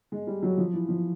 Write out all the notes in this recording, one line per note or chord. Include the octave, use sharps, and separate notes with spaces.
G#3
G3
F#3
F3
E3
F3